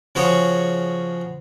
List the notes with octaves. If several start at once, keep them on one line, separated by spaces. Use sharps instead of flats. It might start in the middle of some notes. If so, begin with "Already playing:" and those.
C#3 F3 F#4 G#4 C#5